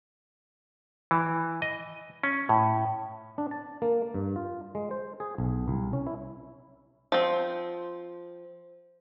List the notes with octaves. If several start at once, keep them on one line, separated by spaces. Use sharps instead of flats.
E3
D#5
C#4
A2
D4
A5
A#3
G2
F4
G#3
C5
G#4
B1
C2
C#4
E4
F3 C4 C5